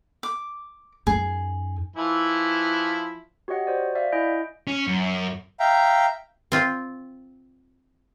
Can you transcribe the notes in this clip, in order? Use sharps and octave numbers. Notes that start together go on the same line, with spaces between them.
D6
F#2 D#4 G#4
E3 F3 E4
F#4 G4 C#5 D#5 F#5
F#4 C5 D5
D5 E5 F5
E4 D#5 G#5 G6 D7
C#4
F#2
E5 F5 G5 A#5
C4 F4